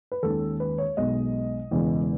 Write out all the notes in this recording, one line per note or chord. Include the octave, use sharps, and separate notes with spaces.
B4
D#2 D#3 G#3 C#4 A4
B4
C#5
B1 B2 G#3 D#5
E1 E2 C#3 E3 G#3